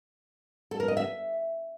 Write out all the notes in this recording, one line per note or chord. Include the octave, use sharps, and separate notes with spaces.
A4
A#4
D#5
E5